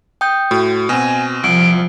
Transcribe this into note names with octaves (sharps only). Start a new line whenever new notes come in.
G5 D#6 G6
A2 F#4
B2 C4 G#5
C2 F3 D7